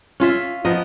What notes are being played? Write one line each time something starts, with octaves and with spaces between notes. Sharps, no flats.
C#4 F4 E5
F3 B3 A#4 D#5